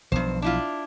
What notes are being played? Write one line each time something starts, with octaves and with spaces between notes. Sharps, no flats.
B1 G2 F3 B3 C5
D4 E4 F4